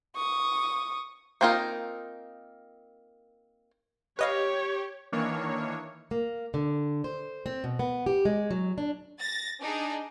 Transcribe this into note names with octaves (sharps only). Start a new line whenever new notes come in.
C#6 D#6
A#3 C4 D#4 F4 A#4
G4 B4 C#5 D#5 F5
D#3 E3 A#3 D4 C#5
A#3
D3
C5
C4
B2
B3
G4
G#3
F#3
D4
A6 A#6
D4 D#4 G#4